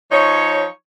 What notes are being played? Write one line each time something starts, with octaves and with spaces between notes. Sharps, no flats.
F3 D#4 C#5